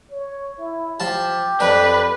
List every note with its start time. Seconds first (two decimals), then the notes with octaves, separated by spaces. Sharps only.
0.11 C#5
0.59 E4
1.00 F3 G4 A5
1.60 F2 D4 B4